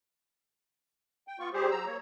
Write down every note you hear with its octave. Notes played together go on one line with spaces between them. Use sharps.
G5
B3 F4 C#6
G3 G4 G#4 C5
F#3 A#5 E6
A#3 C#5